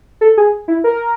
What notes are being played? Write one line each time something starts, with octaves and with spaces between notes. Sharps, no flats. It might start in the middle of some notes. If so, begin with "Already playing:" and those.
A4
G#4
E4
A#4